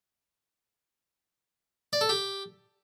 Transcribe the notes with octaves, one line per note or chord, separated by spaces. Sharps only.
D5
A4
G4